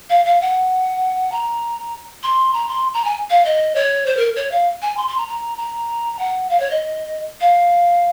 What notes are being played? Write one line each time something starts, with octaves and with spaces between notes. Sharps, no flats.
F5
F5
F#5
A#5
C6
A#5
C6
A#5
G#5
F5
D#5
C#5
C5
A#4
C#5
F5
G#5
C6
C6
A#5
A#5
A#5
F#5
F5
C#5
D#5
F5